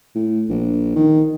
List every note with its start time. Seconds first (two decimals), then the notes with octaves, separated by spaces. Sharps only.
0.15 A2
0.49 A#1
0.96 D#3